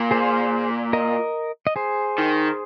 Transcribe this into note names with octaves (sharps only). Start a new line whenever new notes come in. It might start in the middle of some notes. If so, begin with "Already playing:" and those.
Already playing: A#2
G#4 C5
A#4 D#5
D#5
G#4 C5
D#3